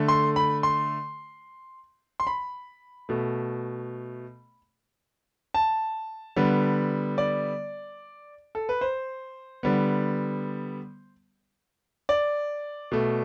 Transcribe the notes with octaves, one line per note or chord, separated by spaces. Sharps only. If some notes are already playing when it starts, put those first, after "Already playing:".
Already playing: D3 A3
C6
B5
C6
C6
B5
B2 A3
A5
D3 G3 B3
D5
A4
B4
C5
D3 G3 B3
D5
B2 A3